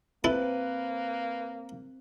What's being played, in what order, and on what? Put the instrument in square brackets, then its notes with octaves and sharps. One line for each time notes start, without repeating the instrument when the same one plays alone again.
[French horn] A#3 [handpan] C4 [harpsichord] E4 A4 [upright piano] B4